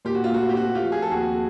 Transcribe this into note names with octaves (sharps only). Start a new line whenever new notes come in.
A#2 G4
F#4
F4
A3 F#4
G4
C4 F#4
F4 G4
F3
G#4
A4
D#2 F#4 G#4